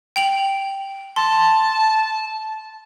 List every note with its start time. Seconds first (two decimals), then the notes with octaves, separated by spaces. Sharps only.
0.16 G5 F7 F#7
1.16 A5 C6